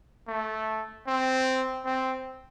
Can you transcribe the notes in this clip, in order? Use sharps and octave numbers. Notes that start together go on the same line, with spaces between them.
A3
C4
C4